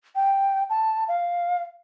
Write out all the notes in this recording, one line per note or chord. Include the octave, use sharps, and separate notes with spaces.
G5
A5
F5